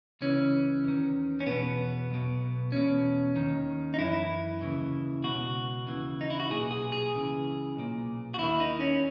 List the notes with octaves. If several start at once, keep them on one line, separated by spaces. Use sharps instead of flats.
C#2 C#3 E3 C#4
E2 D#3
C#4
E2 B2 B3
B1 B2
E2 B2 C#4
D#2 D#3
D#4
F#2 E3 E4
D#2 C#3 E3
C#2 B2 F#4
D#2 C#3 E3
D#4
E4
F#4
B1 A#2 G#4
G#4
G#4
C#2 C#3 E3
B1 A#2
F#4
D#2 D#3 E4
D#4
C#4